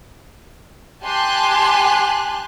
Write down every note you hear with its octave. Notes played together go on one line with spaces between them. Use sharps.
G4 G#5 A5 C6 F#6